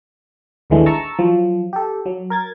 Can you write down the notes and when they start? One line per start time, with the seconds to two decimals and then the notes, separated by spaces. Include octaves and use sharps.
0.70 A#1 D#2 D3 E3 G#3 A3
0.86 A5 A#5 C#6 E6 A6
1.19 F3 F#3
1.73 G4 A4
2.06 F#3
2.30 A#4 G#6 A6